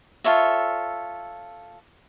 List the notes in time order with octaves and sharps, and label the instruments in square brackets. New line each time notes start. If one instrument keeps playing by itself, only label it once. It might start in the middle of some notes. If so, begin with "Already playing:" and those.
[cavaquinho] F4 A4 C#5 E5